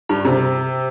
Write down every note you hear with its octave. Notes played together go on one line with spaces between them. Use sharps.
G2
C3